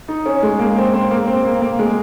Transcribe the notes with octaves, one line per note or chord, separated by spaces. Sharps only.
D#4
C#4
G#3
A#3
C4
C4
A#3
C4
A#3
A#3
G#3